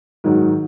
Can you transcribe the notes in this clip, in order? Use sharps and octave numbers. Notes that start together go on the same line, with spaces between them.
G#2 D#3 F#3